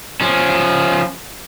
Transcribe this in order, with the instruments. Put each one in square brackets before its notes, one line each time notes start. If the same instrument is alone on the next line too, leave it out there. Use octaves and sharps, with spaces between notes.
[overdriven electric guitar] F3 C#4